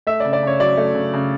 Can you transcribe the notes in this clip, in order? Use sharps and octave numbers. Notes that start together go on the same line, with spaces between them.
A3 E5
D5
C#3
D5
C#3 C#5
F#3 D5
A3
C#3
C#3